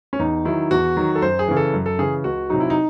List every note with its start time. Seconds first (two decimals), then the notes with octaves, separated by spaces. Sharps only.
0.13 C#4
0.19 E2 D#4
0.45 D#3 F#3 E4
0.71 E2 F#4
0.97 D#3 F#3
1.15 A4
1.22 F#2 C5
1.39 G#4
1.48 C#3 E3
1.56 A4
1.74 F#2
1.86 A4
1.99 C#3 E3 G#4
2.24 C#2 F#4
2.50 C3 F#3 D#4
2.60 E4
2.70 D#4